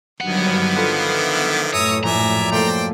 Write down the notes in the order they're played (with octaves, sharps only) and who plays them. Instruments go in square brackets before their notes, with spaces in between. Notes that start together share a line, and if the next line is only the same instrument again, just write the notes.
[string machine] G2 F#3 G#6 [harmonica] D3 D#3 F3 [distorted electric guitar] B3 F#5
[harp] F4 A4 B4 [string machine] C7
[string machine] E5
[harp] F#2 [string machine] A2 [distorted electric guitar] C#5 [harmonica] A#5 D#6 E6
[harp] A#1 [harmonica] D5 E5 G#5 [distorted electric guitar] A#5
[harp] A3 A#3 [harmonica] C5 D5 G5